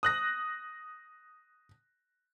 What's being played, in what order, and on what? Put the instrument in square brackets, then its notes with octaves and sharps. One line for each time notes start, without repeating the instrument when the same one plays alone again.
[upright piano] D#6 F#6 A#6